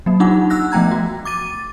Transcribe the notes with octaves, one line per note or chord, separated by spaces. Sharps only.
F#3 A#3
D4 D#4 F4 G4 F#5
F#5 E6 F#6 A#6
F3 A3 B3 G5 A#5 G#6
F#4
D6 A6 D#7